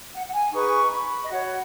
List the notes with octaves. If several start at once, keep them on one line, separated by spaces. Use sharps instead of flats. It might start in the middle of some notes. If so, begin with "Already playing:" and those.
F#5
F#5
G#5
D#4 G#4 B4 C#6
B5
D#5
F#4 C#5 F#5